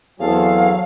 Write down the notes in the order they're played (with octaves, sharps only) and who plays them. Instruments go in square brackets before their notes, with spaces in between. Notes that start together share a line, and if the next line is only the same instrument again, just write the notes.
[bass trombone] E2 [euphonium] F#3 [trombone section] C4 G#4 A4 [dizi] F5